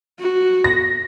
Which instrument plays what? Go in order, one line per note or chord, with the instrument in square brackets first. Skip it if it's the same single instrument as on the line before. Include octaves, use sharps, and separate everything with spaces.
[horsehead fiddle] F#4
[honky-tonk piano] A#6